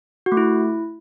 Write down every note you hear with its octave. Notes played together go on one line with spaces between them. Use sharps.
F#4
A3
E4